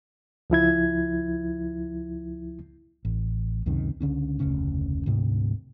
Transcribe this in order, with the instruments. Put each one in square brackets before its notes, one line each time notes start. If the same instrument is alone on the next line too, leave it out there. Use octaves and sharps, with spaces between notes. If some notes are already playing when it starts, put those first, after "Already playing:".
[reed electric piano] C#2 F3 E4 G#6
[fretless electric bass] A1
C#2 F#2 C3 D#3
C#2 D3 C#4 D4
F1 D2 C#3 C#4
D2 G#2 C3